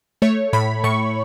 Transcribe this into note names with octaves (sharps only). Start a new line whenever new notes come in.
A3 C#5
A2 B5
A2 C#6